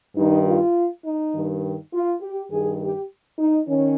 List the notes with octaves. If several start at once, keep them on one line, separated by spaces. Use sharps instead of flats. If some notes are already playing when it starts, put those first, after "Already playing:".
G2 D#3 D#4
F4
D#4
G2 D#3
F4
G4
G2 D#3 G#4
G4
D#4
D#3 C#4